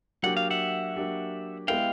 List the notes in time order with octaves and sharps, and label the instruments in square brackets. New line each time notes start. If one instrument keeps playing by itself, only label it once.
[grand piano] F#3 A#3 D4 G4 [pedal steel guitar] F#5
[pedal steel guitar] F5
E5 F#5
[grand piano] F#3 A#3 D4 G4
[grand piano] G#3 B3 E4 G4 [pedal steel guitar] F5 G5